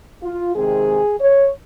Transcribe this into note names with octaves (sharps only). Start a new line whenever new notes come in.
F4
C3 D#3 G#3 C4 G#4
C#5